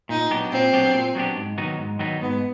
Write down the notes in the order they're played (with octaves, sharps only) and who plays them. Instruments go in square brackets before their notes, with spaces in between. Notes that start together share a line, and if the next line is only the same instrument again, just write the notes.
[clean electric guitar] A#2 [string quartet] D#4
[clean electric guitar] F#3 B3 D4 G4
[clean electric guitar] A#2 [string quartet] C4
[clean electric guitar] F#3 B3 D4 G4
A#2
F#3 B3 D4 G4
G#2
D#3 F#3 B3 D#4
G#2
D#3 F#3 B3 D#4
[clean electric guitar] G#2 [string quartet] B3